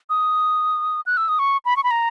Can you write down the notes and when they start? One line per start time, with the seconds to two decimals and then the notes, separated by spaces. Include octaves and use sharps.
0.10 D#6
1.06 F#6
1.17 E6
1.29 D#6
1.39 C#6
1.65 B5
1.77 C#6
1.84 B5
1.91 A#5